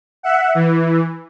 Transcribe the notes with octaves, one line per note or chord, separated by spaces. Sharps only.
E5 F#5
E3